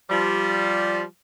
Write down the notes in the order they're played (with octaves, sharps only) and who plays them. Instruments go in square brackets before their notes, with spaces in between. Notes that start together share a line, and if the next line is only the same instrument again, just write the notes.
[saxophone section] F3 G3